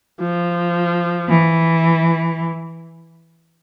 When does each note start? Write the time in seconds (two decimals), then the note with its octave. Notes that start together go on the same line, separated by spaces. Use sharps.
0.20 F3
1.28 E3